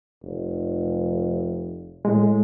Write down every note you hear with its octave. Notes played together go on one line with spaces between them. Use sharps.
F1
A2 G#3